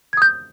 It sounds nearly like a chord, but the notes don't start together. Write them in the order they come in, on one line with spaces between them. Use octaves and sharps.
G#6 D#6 G6